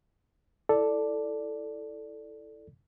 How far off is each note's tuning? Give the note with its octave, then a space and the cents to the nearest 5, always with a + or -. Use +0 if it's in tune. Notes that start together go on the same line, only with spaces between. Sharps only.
E4 -5 A4 +0 D5 +0